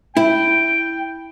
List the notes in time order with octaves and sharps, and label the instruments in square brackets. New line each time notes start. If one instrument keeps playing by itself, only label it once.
[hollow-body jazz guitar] E4 [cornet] G5